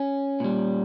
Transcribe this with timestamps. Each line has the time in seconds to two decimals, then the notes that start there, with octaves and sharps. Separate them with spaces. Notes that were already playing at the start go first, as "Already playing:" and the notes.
Already playing: C#4
0.40 A#2 G3